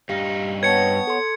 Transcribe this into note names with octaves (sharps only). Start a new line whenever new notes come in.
G2 D#4 G4 F5
B3 B4 C#5 G5 A5 G#6 C#7
A4 C6